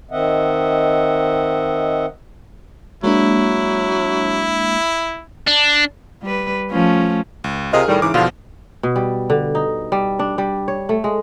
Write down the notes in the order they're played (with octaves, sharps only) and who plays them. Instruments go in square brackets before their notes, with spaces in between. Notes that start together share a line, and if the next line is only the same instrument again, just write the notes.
[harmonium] D#3 C4 D#5 E5 F#5
[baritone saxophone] F#3 [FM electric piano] G#3 A#3 D4 [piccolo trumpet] E4
[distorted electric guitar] D4
[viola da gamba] G3 B4
F3 A3 C#4
[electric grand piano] C#2
[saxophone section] C3 F4 D#5 [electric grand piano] G#4 A#4 F6
[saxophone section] A2 D#3 G3
[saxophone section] G#2 C#3 E3 [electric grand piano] D6
[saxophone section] E2 D3 F4 [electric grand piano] B2 F3
[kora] B2
G3
D3
D#4
G3
D4
G3
C#5
A3
G#3